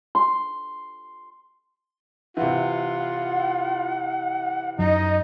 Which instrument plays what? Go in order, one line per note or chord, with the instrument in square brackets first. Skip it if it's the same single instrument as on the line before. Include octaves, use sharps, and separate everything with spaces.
[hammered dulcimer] C6
[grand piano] C3 E3 [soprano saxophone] F4 [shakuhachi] F#5
[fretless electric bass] F#2 F#3 [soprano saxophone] D#4 [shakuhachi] D#5